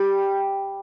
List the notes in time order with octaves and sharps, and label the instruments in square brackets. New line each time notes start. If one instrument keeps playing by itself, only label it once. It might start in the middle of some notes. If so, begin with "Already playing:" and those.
Already playing: [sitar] G3